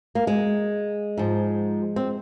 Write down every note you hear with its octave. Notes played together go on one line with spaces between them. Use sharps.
A#3
G#3
G#2 F3
C4